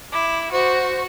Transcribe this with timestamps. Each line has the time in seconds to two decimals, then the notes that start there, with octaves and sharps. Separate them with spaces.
0.13 E4 D6
0.52 F#4 C5